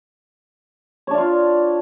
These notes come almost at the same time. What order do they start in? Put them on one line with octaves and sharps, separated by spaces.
C#5 D4 F5 F4